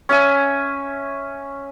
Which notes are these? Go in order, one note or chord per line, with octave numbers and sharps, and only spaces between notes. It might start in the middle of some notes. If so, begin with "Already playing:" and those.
C#4 E5 G#5